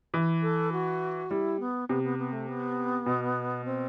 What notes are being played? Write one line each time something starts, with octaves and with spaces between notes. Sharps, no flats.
E3
A4
F#4
G3 E4
B3
C3 B3
B3
B3
A3
B3
B2
C4